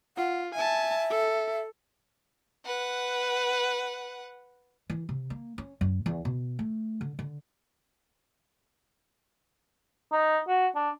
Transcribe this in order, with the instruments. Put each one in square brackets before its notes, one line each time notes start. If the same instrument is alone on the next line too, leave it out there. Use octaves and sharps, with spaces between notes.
[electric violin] F4 [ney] F#5
[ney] E5 [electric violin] G#5 A5
[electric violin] A4
[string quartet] B4 F#5
[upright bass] E3
C3
A#3
C#4
F#2
E2
B2
A3
D3
D3
[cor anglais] D#4
F#4
D4